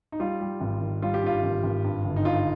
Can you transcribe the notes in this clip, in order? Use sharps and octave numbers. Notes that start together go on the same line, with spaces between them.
D#4
G3 F4
G3
G#1
D#3
G3 F4
G4
G2 F4
G#1
G#1
G2
G1
D#4
G2 F4